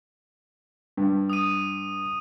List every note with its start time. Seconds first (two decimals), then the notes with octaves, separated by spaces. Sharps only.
0.97 G2
1.30 D#6 D#7